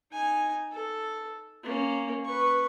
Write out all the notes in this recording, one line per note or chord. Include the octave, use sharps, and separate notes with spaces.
D#4 G#5
A4
A#3 C#4
B4 C#6